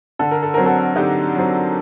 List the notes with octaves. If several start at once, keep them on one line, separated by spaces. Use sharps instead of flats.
D3 A4
A#4
A4
F#3 C4 A#4
F#4 A4
D3 D#4 G4
F#3 C4